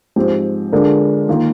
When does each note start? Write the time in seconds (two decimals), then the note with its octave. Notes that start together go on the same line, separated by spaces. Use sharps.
0.16 G#2 F3 C4 G4
0.72 D3 G#3 D4 F4 A#4
1.29 D#3 A#3 F4